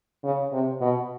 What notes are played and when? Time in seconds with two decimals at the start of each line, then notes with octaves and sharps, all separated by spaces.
0.23 C#3
0.52 C3
0.81 B2